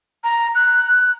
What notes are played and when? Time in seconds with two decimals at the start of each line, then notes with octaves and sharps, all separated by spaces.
0.24 A#5
0.55 F#6